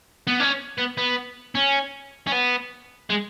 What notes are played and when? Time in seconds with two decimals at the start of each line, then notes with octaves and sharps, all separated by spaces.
0.27 B3
0.40 C#4
0.78 B3
0.97 B3
1.55 C#4
2.27 C#4
2.32 B3
3.10 G#3